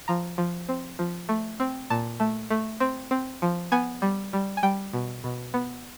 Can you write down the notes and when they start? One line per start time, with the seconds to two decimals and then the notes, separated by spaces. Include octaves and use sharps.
0.08 F3 A#5
0.38 F3
0.69 C4
0.99 F3
1.29 A3
1.60 C4
1.90 A#2 A5
2.20 A3
2.50 A3
2.80 C4
3.11 C4
3.42 F3
3.72 B3 G#5
4.02 G3
4.33 G3
4.57 G#5
4.63 G3 G5
4.93 B2
5.24 B2
5.54 B3